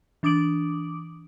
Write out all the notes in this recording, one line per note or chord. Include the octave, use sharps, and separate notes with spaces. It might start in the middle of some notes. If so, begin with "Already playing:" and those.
E3 D4 D6 D#6 D7 F#7